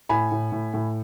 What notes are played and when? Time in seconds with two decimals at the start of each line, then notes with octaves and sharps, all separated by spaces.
0.09 A2 G#5 B5
0.32 A2
0.52 A2
0.74 A2